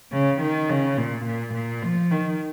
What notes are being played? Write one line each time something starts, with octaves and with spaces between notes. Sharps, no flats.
C#3
D#3
C#3
A#2
A#2
A#2
F3
D#3